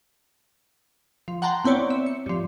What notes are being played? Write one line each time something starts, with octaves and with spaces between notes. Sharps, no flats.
F3
F#5 G5 A5 A#5 C6
B3 C4 E4 C#5 D5
E5
C#7
G2 F3